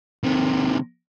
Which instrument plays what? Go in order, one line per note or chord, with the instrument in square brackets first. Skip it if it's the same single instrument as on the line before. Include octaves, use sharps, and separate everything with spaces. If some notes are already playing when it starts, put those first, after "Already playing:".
[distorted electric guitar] C3 D#3